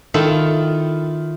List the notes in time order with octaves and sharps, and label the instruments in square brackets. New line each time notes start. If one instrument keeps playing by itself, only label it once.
[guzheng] D#3 E4 F4 A4